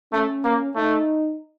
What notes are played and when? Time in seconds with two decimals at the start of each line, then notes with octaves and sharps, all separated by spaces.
0.13 A3 C#4
0.44 A#3
0.76 A3 D#4